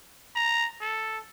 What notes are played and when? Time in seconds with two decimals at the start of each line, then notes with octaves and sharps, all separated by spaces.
0.35 A#5
0.81 A4